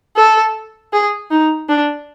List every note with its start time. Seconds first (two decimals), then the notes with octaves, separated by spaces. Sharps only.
0.17 A4
0.93 G#4
1.31 D#4
1.69 D4